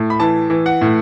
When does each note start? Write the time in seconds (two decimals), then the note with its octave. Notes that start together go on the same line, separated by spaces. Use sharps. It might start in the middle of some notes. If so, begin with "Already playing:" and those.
Already playing: A2
0.10 B5
0.20 E3 A5
0.50 E3
0.66 F#5
0.81 A2